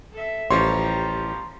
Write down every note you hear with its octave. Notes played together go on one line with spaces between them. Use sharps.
A4 E5
A1 F3 G3 G4 C#5 A#5 C6